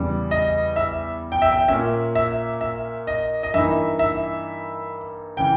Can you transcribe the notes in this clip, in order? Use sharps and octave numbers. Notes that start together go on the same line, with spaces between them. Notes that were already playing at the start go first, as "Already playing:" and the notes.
Already playing: E2 C#3 G3
D#5
E5
G5
E5
G5
A#2 A#3 C#4 E5
E5
E5
D#5
D#5
G2 E3 A#3 D#4 E5
E5
C#3 E3 G5